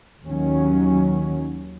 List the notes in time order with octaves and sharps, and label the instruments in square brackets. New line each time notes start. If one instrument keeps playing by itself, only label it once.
[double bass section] D#2 D#3 F#3 C#4